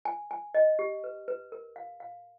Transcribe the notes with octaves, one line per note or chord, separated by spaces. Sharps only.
G#5
G#5
D#5
G4
B4
B4
A#4
F5
F5